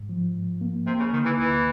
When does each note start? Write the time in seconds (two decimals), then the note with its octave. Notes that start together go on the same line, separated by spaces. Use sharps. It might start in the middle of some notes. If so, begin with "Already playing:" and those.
Already playing: G#2
0.09 F3
0.36 G#2
0.61 A#3
0.87 C3 A#3
0.99 C#3
1.13 D3 D#3
1.25 E3
1.38 D2 E3